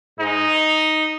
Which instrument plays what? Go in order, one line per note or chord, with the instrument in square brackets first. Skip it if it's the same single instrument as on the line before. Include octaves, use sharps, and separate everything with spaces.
[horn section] G#2 G#3 D#4